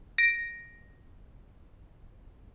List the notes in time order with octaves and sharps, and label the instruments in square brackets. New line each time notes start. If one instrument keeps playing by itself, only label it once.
[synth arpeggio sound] A#6 D7